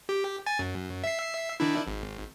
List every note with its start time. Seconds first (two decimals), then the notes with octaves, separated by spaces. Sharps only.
0.09 G4
0.46 G#5 A6
0.59 F#2
1.04 E5 C7
1.60 D#3 D4 E4
1.87 G#1